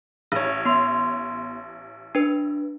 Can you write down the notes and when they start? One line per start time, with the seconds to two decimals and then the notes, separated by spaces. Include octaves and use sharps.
0.32 A1 C#5
0.65 B3 C6
2.15 D4 B4